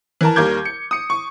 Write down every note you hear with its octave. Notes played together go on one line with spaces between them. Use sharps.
E3 A#4 A5
D#2 G3 A#4 D6 G6 G#6
C#7
D#6 C#7
C#6